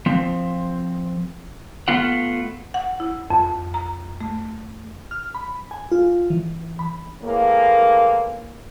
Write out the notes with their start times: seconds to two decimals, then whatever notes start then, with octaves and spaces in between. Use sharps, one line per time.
0.06 F3 C4
1.88 A3 B3 F4 F#5
2.74 F#5
3.00 E4
3.30 F2
3.74 A#5
4.21 A3
5.11 F6
5.35 B5
5.71 G#5
5.92 F4
6.30 E3
6.79 B5
7.22 A2 E3 G#3 A#3